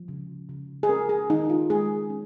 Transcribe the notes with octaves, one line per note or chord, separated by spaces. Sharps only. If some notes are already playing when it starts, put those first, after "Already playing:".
Already playing: F3
C#3
C#3
G#4
C#4 A#4
G#4
D#3 D#4
F4
G#3 G#4
C#4